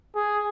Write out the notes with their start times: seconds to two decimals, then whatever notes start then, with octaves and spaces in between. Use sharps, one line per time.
0.16 G#4